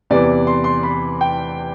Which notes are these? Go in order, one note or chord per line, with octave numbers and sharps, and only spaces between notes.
E2 C3 E3 D5
C6
C6
B5
G5